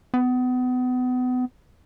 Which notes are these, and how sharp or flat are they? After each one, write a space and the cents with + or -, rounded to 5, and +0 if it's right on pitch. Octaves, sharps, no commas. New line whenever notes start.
B3 +30